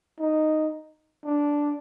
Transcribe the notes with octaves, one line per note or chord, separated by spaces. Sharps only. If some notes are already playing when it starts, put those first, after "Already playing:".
D#4
D4